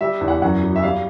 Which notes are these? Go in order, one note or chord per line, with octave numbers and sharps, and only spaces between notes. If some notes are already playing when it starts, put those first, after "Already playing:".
G3 E5
E2
F#5
F#2 F#5
F#3
E5
G3 F5